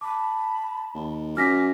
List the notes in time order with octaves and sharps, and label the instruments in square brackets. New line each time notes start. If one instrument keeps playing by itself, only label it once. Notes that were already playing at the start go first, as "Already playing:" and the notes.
[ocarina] A5 [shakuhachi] B5 [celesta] D6
[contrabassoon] D#2
[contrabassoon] F#2 [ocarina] G#5 [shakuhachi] D6 [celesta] F6 A#6 B6